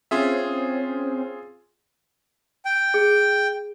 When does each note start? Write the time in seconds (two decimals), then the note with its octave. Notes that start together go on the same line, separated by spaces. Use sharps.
0.11 C4 C#4 F4 G#4 E5
2.65 G5
2.94 G#4